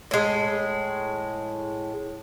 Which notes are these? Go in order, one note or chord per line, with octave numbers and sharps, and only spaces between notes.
A2 G#3